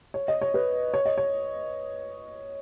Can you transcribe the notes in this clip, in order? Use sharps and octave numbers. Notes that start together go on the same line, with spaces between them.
C#5
D#5
C#5
B4
C#5
D#5
C#5